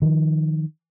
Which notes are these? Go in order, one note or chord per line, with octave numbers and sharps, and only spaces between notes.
D#3 F3